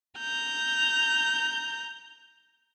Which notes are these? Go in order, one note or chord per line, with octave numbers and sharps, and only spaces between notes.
A#5 G6